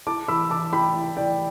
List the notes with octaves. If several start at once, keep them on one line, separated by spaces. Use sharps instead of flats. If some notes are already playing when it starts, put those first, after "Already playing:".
E4 A5 D6
E3 B5 E6
E3 A5 D6
E4 G5 B5
E4
E3 D5 G5